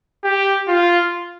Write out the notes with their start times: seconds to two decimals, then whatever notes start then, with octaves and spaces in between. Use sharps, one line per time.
0.24 G4
0.68 F4